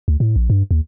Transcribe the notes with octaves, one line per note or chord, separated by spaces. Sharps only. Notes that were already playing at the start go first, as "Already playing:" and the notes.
D2
A2
A#1
G2
D#2